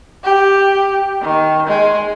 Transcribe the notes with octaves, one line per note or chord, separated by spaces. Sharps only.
G4
D#3
G#3